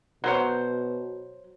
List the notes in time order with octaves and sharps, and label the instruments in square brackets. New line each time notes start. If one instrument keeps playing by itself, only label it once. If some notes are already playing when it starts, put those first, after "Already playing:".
[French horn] B2 [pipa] F#3 C5 C#5